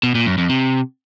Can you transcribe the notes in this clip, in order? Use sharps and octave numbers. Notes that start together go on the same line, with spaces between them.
B2
A#2
F#2
F2
C3